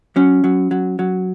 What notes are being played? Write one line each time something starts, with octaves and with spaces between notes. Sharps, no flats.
F#3 C#4
F#3
F#3
F#3